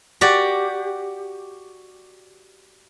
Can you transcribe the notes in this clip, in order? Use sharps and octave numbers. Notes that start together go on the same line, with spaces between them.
F#4 G4 D5